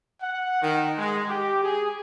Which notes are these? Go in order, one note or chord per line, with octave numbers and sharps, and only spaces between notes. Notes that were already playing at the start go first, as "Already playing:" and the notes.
F#5
D#3
G#3
G4
G#4